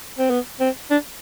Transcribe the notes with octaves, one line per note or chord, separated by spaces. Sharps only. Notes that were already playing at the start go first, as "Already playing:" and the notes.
C4
B3
C4
D4